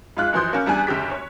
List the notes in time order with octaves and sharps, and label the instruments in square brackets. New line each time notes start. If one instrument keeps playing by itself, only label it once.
[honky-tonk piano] G#2 F4 F#6
F#2 E3 F3 C6 D#6 G6
A#3 C#4
E2 G3 D4 G#5 F#6
F#1 D2 A3 G4 B6
C#5